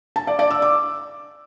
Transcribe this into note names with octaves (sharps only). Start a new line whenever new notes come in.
A5
D5
D5
E6
D6